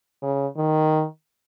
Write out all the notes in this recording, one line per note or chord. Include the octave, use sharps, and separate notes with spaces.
C#3
D#3